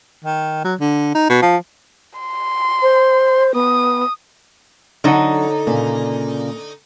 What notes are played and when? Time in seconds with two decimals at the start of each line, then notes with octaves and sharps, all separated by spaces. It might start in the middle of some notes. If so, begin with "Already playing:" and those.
0.25 D#3
0.64 F#3
0.80 D3
1.15 D#4
1.30 B2
1.42 F3
2.20 C6
2.82 C5
3.54 B3 D#6
5.04 D3 F#3 D4 D#4 F#5
5.67 A#2 C#3 A#3